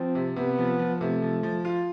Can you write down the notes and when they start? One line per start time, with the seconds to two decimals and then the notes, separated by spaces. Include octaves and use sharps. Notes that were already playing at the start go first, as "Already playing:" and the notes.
Already playing: F3 C4
0.15 C3
0.36 C3 B3
0.58 F3
0.79 F3
1.01 C3 A3
1.22 F3
1.43 F3
1.65 F4